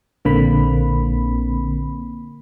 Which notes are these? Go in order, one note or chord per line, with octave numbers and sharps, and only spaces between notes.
A#1 D3 A#3 C4 B5